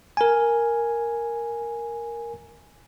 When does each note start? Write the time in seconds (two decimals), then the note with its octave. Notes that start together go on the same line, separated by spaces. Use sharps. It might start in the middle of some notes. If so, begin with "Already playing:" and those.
0.17 A#4 G#5